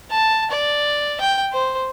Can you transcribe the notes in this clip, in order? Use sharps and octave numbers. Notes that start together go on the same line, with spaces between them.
A5
D5
G5
C5